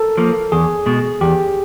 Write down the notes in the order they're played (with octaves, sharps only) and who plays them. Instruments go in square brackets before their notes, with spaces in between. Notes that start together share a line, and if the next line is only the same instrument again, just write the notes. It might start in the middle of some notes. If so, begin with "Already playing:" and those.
Already playing: [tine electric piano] A4 A#4
[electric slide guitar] F3 A#3
[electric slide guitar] E2 [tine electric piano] G#4
[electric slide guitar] B2 G#3
[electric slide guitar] E2 [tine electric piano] G4